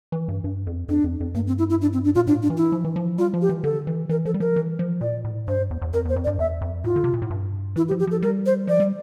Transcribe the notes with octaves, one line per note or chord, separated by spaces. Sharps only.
E3
G2
G2
F2
F2 D4
F2
F2
G2 A#3
C4
E4
E4
D4
C4
D4
A#2 F4
A2 D4
D4
E3
E4
F3
E3
F3
G3 F4
F3
G4
E3
D3 A4
E3
E3 A#4
F3 A4
G3
F3 A#4
E3
F3
A#2 D5
A2
G2 C5
E2
E2
F2 A#4
E2 C5
F2
D5
G2
E2 E5
F2
A2 F4
D3
C3
A#2
A2
G2
E3 E4
G4
F3
G4
F3 A4
G3 A#4
C5
F3 D5
G3